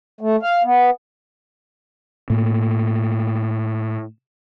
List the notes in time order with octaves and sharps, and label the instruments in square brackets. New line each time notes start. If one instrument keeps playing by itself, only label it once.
[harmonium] A3
F5
B3
[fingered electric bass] A2 A#3